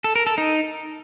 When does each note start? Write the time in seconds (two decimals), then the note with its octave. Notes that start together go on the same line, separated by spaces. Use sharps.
0.04 A4
0.15 A#4
0.27 A4
0.38 D#4